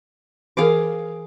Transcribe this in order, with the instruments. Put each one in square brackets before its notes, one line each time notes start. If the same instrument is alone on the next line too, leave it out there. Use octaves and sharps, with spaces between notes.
[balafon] E3 A#4 [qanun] G#4 F5 D6